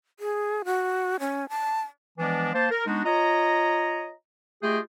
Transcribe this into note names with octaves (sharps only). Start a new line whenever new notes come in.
G#4
F#4
C#4
A5
E3 F3 G#3 B3 D4
A#3 C5 A5
A#4
G#3 B3 D4 D#4 F#4
F4 C#5 D#5 A#5
A3 F4 G4 G#4 D#5 G5